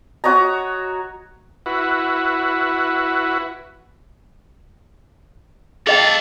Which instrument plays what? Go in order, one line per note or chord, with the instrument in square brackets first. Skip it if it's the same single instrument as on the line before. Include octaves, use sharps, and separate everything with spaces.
[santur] F#4 C#5 D#5 A#5
[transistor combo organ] E4 F#4 B4
[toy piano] G#4 D#5 G5 [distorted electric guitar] A4 F5